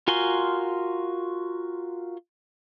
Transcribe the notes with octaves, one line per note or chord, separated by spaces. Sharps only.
F4 F#4 A#4 G#5 C6